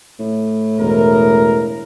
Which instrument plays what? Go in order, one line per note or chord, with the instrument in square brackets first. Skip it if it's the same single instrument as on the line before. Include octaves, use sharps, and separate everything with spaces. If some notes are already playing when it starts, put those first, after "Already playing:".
[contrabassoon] A2
[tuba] E1 [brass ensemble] A#4